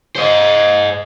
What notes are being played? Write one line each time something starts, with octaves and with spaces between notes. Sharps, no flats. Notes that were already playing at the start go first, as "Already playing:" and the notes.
C5 D#5